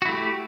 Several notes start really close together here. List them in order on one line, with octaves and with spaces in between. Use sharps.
F#4 E4 A3 G4